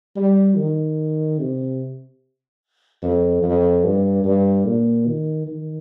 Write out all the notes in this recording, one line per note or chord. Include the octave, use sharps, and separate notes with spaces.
G3
D#3
C3
F2
F2
G2
G2
A#2
D#3
D#3